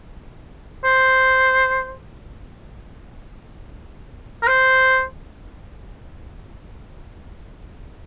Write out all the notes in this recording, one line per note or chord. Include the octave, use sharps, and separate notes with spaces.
C5
A#4
C5